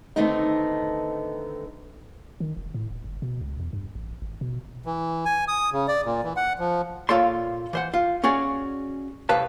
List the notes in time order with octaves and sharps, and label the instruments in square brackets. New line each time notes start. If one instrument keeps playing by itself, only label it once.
[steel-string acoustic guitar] D3 D#3 A3 B3 C4 D#4
[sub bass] D#3
F1
A2
D#1
G1
B2
C#2
E2
G2
A1
G#1
B2
[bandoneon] E3
G#5
D#6
C#3
D5
A#2
E3
F#5
F3
[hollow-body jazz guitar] A#2 F4 A4 C#5 D5 C6
E3 C5 F#5
F4
C#4 F#4 G#4 D5
C2 A2 B4 F5 A5